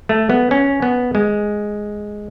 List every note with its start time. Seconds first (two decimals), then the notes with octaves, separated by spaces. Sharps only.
0.09 A3
0.30 B3
0.51 C#4
0.82 B3
1.15 G#3